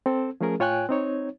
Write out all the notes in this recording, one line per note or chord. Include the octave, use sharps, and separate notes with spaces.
C4 A4
F3 A3 C#4 G#4 A#4
A2 F4 C#5 G5 G#5 F#6
C4 D#4 C#5